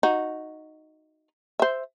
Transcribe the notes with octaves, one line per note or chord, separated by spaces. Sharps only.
D#4 F#4
C5 E5